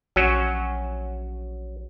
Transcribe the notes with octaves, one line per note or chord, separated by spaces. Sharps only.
A#1 F#3 C#4 F#4